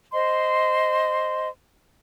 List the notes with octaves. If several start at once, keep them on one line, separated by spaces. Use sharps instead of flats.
C5 D#5 C6